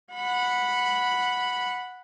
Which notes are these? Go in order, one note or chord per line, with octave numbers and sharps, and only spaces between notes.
F#5 B5